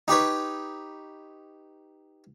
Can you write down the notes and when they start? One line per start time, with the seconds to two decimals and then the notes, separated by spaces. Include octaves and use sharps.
0.08 D#4 G4 B4 C#5